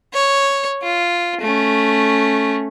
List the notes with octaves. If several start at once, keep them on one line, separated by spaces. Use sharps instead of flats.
C#5
F4
A3 C#4